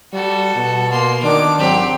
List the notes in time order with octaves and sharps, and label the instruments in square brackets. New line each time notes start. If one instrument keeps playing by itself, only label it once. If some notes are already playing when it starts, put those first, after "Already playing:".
[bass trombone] G3 [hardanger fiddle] F#4 A4
[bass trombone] B2
[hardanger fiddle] A#3 C6
[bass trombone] D#3 [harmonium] D4 [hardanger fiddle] D6
[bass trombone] G#1 [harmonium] F#3 [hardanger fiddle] C4 G4